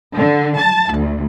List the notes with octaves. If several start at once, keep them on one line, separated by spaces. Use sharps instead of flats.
D3
A5
D2